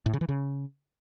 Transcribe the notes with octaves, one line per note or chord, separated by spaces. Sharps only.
A2
C#3
E3
C#3